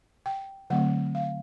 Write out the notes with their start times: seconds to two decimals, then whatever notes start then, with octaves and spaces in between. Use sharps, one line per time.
0.26 G5
0.70 D3 F#3 A3 C4 F#5
1.15 F5